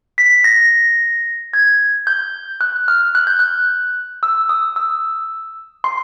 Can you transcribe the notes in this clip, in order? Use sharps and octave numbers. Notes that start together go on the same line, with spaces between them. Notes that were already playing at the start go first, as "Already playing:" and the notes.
B6
A#6
G#6
G6
F#6
F6
F#6
G6
F#6
E6
D#6
E6
C6